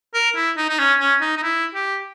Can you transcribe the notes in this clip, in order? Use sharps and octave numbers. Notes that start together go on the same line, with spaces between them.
A#4
E4
D#4
D#4
C#4
C#4
D#4
D#4
E4
G4